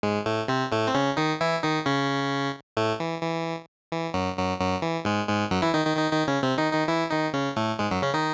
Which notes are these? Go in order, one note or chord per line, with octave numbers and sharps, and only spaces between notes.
G#2 G#3
A2 A3
C3 C4
A2 A3
C4
C#3 C#4
D#3 D#4
E3 E4
D#3 D#4
C#3 C#4
A2 A3
E3
E3
E3
F#2 F#3
F#2 F#3
F#2 F#3
E3
G#2 G#3
G#2 G#3
F#2 F#3
E3 E4
D#3 D#4
D#3 D#4
D#3 D#4
D#3 D#4
C#3 C#4
C3 C4
D#3 D#4
D#3 D#4
E3 E4
D#3 D#4
C#3 C#4
A2 A3
G#2 G#3
F#2 F#3
C#3 C#4
D#3 D#4